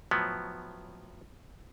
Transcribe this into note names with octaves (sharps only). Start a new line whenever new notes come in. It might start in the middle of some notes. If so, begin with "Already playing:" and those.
A2 F3 F#3 B3